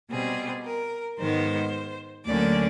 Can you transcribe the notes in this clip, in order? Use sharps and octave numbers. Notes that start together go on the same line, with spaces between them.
B2 G3 C4 G#4
A#4
G#2 D#3 G#3 B3 C5
D2 D3 F#3 A#3 C#4 D5